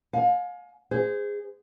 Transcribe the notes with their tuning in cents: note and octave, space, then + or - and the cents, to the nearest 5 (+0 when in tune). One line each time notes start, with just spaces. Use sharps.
F5 +35 G#5 +30
G#4 -15 C5 -25